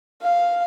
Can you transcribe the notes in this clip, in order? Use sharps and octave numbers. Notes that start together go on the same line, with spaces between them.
F5